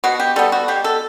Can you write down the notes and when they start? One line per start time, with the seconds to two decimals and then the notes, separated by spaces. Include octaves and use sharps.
0.04 B2 F#4
0.20 G4
0.36 G3 B3 A4
0.52 F#4
0.68 B2 G4
0.84 A4